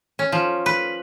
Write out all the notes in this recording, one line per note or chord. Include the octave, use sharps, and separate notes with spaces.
C#4
F3
B4